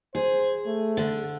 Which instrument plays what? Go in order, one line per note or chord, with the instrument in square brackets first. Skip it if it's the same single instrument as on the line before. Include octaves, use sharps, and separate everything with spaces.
[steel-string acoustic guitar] G#4 [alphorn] C5
[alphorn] A3
[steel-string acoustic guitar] D3